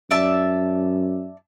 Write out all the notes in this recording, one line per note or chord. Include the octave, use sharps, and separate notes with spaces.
F#2 D5 E5 A5